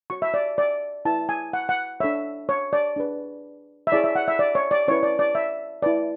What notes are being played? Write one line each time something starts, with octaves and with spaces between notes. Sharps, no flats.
F#4 C#5 C#6
E5
D5
D5
E4 B4 A5
G#5
F#5
F#5
D4 A4 C#5 E5
C#5
D5
D4 G#4 B4
E5
E4 G#4 C#5 D5
E5
F#5
E5
D5
C#5
D5
C#4 E4 B4 C#5
D5
D5
E5
E4 B4 D5